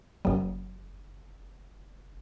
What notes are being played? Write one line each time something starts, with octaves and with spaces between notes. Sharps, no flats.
F#1 F#2 F#3